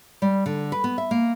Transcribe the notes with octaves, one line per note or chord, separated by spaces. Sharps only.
G3
D3
B4
B3
E5
A#3